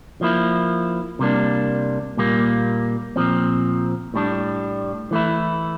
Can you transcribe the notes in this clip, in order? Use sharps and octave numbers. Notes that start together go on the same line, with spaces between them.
F3 A#3 E4
C3 G3 A#3 D4
A#2 G3 A#3
A#2 F3 C4
A2 G3 D4
E3 A3 E4